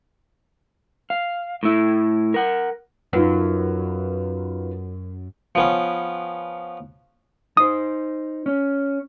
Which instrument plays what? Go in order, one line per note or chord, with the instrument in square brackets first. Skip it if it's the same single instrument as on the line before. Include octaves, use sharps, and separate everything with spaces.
[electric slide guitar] F5
A2 E4
A#4 F#5
[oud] F#2 [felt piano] D#4 F4 B4
[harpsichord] F3 B3 C#4
[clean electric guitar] D#4 C5 [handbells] D#6
[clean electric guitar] C#4